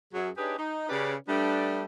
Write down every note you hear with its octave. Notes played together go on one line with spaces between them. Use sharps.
F#2 F#3 G#4
D4 D#4 G4 G#4 B4 C#5
D#4
C#3 C#4 G4 B4 D5
G3 A3 B3 D4